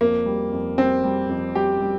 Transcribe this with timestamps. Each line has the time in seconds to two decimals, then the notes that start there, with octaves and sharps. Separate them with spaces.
0.01 F2 A#3
0.26 G3
0.52 F2
0.78 G3 C4
1.04 G3
1.29 F2
1.55 G3 G4
1.82 G3